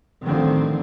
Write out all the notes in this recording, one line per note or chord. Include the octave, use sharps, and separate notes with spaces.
A1 D3 D#3 F3 G3 C4